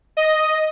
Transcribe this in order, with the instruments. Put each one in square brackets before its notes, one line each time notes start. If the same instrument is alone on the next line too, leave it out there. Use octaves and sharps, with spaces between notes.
[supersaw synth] D#5